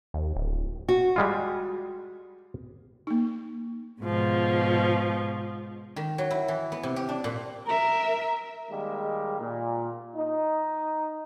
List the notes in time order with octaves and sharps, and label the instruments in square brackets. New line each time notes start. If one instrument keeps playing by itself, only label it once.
[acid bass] D#2
D1
[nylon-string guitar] F#4
[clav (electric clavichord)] G3 G#3 F4
[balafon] A#3 D#4
[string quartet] G#2 B2 F3
[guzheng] D#3
F#3
E4
E3
B3
C3
G4
D4
A#2
[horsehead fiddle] A#4 E5 [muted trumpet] A#5
[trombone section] D#3 G3 G#3 A#3
A#2
D#4